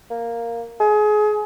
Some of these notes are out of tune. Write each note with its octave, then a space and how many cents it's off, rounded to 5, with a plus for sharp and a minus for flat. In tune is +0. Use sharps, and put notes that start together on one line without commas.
A#3 +0
G#4 +30